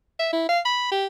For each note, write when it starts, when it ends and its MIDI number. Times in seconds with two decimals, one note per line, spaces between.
0.19 0.31 76
0.32 0.49 64
0.49 0.60 77
0.65 0.87 83
0.91 1.06 67